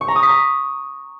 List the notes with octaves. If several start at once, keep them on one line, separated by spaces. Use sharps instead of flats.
C#6
A#5
D#6
B6
A#5